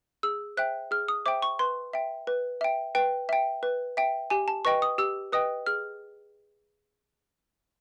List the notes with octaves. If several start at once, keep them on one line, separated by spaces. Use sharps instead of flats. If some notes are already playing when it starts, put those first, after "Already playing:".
G#4 E6
C5 E5 G5 F#6
G#4 F6
D#6
C5 E5 G5 D6
C#6
B4 C6
E5 G5
B4
E5 G5
B4 G5
E5 G5
B4
E5 G5
G4 G#5
A5
B4 D#5 G5 C#6
D#6
G4 E6
B4 D#5 G5 D#6
G#4 F6